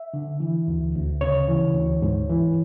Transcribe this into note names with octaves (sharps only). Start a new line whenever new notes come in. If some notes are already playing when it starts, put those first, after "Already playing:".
Already playing: E5
D3
E3
D2
D2
C#3 C#5
E3
D2
G#2
E3